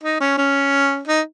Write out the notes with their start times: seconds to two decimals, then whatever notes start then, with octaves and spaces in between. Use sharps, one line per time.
0.03 D#4
0.20 C#4
0.38 C#4
1.08 D#4